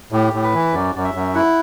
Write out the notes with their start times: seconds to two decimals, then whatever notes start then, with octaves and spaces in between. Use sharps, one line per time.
0.12 A2 G4
0.33 A2
0.44 B4
0.54 E3
0.73 F#2 D5
0.95 F#2 D5
1.04 E5
1.14 F#2
1.35 E4 F#5